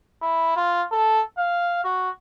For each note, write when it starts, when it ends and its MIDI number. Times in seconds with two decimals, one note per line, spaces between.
0.22 0.53 64
0.56 0.82 65
0.92 1.21 69
1.38 1.83 77
1.84 2.09 66